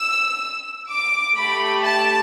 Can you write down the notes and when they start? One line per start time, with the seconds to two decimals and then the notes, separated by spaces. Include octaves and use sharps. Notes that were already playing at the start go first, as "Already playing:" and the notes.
Already playing: E6
0.90 D6
1.36 A3 G4 B5
1.84 A5